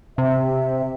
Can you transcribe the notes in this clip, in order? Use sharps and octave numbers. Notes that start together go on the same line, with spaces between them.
C3 E5